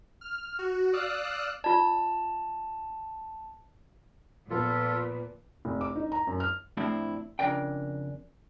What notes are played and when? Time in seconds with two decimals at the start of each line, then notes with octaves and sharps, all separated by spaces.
0.21 F6
0.59 F#4
0.93 D5 F5 D#6 E6 F#6
1.64 F4 D5 A5
4.50 A#2 F3 B3 F4 A4 B4
5.65 F1
5.81 D6
5.96 D#4
6.12 A#5
6.27 F#2
6.40 F6
6.77 A2 F3 C4 D4 E4
7.39 F2 C#3 D4 A#4 D5 G5